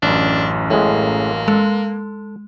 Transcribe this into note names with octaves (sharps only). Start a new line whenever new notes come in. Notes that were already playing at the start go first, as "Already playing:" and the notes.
A1 F#2 D4
A2 G#3 A#3
G#3 A4